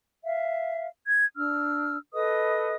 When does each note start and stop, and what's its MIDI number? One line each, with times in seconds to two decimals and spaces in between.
0.23 0.87 76
0.23 0.87 77
1.06 1.25 92
1.36 1.96 62
1.36 1.96 88
1.36 1.96 89
2.13 2.75 69
2.13 2.75 71
2.13 2.75 75
2.13 2.75 87